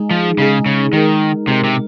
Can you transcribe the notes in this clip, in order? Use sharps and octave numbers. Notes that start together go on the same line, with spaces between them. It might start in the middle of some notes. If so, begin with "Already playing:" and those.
Already playing: G#3 D#4 G#4
F3
C#3 G#3 D#4 G#4
C#3
D#3 G#3 D#4 A#4
C3 G#3 D#4 A#4
C3